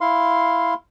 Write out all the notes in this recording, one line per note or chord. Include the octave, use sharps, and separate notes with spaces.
E4 F5 C6